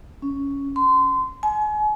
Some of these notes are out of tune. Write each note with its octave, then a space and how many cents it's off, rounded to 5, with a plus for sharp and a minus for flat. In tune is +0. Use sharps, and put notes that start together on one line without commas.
C#4 +5
C6 -25
G#5 +35